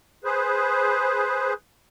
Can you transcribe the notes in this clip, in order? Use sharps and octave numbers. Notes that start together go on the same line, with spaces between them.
G#4 B4 C5